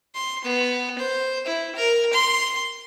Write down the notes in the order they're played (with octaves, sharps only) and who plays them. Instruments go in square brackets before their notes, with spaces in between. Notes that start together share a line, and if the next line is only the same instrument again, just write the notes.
[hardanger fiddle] C6
B3
C5
E4
A#4
C6